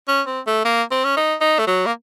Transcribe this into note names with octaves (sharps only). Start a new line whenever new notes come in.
C#4
C4
A3
A#3
C4
C#4
D#4
D#4
A3
F#3
A#3